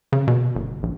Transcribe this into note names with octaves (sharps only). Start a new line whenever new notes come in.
C#3
B2
G1
A#1